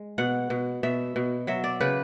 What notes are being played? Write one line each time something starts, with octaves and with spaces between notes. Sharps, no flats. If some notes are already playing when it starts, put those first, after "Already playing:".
Already playing: G#3
B2 F#5
B2
B2 E5
B2
F#3 E5
D5
C#3 B4